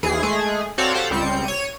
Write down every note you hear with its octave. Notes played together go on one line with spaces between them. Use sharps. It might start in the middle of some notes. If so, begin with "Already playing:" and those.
D#2 E3 G#4 C7
G#3 A3 G#4
C4 F#4 A4 C#5 D5 F5
G4 A4 C5 F5 F#5
C#2 G3 C4 G6 C#7
C#5 D#7